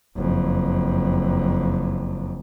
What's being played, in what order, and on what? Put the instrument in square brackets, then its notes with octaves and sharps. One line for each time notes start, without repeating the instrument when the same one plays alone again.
[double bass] F#1 F2